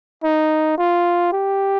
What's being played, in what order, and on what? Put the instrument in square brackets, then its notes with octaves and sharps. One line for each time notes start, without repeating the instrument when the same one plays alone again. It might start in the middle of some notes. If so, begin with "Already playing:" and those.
[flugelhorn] D#4
F4
G4